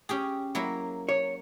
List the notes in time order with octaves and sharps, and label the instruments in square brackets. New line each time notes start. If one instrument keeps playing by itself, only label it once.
[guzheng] C#4 G4 G#4
F#3 A#3 E4
[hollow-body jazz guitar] C#5